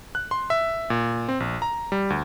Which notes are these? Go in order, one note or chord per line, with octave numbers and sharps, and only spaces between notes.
F#6
C6
E5
A#2
C4
A#1
A#5
G3
D2